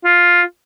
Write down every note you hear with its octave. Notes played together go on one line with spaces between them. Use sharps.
F4